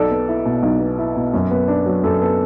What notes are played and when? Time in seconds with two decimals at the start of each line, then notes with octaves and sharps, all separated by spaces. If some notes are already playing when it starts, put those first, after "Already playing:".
Already playing: B1 A4 D5
0.11 B3
0.28 E4
0.45 B2
0.62 B1
0.81 B3
0.98 E4
1.16 B2
1.34 F#2
1.51 B3
1.68 D4
1.86 F#3
2.03 F#2 A4
2.22 B3 A4